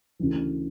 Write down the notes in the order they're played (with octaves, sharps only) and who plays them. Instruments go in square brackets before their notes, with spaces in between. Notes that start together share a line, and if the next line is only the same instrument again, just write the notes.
[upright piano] D2 C#3 E3